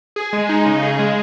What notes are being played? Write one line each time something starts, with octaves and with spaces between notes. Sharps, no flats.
G#4
G#3
D#4
C#3
G#4
G#3